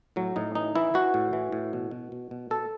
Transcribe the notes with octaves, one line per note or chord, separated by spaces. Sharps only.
A2 F#3
A2 D#4
E3 D#4
E3 E4
E3 F#4
A2
E3
A2
B2
B2
B2
B2
B2 A4